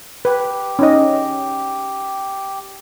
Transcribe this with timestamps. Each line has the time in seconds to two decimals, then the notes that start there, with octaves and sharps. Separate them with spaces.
0.25 G4 B4
0.79 C#4 D#4 D#5